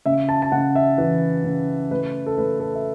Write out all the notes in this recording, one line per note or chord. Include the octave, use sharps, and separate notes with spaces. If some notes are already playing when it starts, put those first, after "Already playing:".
C#3 E5
A5
A5
C#3 F#5
E5
E3 B4
C#3
A3 B4
A4
A3 B4
A4
E5